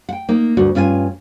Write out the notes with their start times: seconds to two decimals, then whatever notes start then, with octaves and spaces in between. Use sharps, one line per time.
0.09 F#5 G5
0.29 A#3 D#4
0.57 D2 G2 F#4
0.75 G2 C#4 F4 A#4 G#5